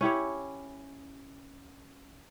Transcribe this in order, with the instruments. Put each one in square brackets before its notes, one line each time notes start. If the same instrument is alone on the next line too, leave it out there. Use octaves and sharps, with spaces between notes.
[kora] C#4 E4 G4 C#5